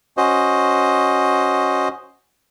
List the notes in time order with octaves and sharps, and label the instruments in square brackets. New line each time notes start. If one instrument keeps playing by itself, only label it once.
[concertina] C#4 F#4 C5 D#5